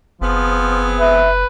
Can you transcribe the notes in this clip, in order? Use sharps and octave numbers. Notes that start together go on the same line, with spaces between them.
F#1 F3 B3 C4 G#4
B4 E5